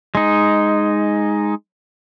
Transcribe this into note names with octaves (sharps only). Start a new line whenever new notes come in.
G#3 D#4